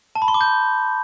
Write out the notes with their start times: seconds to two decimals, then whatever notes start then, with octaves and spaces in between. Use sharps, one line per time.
0.16 A5
0.22 B5
0.28 C6
0.34 D6
0.41 G6